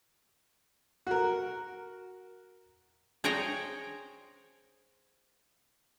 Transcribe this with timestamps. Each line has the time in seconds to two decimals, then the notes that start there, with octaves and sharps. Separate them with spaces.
1.07 F#4 A#4
3.24 G#4 C5 C#5 G5 G#5 A#5